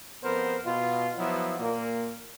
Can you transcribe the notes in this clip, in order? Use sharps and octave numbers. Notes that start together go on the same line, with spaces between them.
F2 B3 A#4 C5
B2 F4
F3 F#3 B3 E4
A#2 A#3